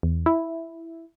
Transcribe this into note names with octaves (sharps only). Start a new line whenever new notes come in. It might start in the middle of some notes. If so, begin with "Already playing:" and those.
E2
E4